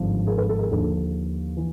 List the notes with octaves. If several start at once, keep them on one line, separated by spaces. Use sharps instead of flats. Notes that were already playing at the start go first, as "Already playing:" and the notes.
Already playing: G#1 G2 D3 F3
G#4 A#4
A4 B4
A4
G#4 A#4
D#2 D3 F3 A4
E3